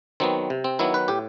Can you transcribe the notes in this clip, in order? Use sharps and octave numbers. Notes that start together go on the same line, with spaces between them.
D#3 F#3 B3 C4
C3
C4
D#3 F#3 B3 E4
B4
A2 G4